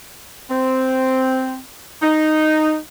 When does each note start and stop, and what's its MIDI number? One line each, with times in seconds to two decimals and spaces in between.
0.50 1.58 60
2.02 2.77 63